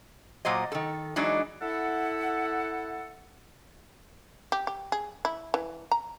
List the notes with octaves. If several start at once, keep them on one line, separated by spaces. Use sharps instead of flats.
A#2 F#3 C5 D#5
D#3 A4
E3 F#3 G#3 D4 D#4
E4 A4 F#5
G4
G4
G#4
E4
E3
A#5